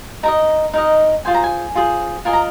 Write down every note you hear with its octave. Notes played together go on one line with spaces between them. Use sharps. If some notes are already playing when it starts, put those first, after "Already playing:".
D#4 A#4 D#5 A#5
D#4 A#4 D#5
F4 G#4 C5 G#5
A#5
G#5
F4 G#4 C5
F4 A#4 D#5 G#5
A#5